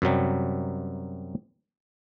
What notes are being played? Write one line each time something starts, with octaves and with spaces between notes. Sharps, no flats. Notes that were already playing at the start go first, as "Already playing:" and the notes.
F#2 C3 F#3 G3